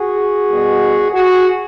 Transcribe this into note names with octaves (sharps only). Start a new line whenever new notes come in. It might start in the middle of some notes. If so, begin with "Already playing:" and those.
Already playing: F#4 G#4
B2 G3
F#4 G#4